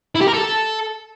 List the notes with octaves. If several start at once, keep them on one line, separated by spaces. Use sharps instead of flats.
E4
G4
A#4
A4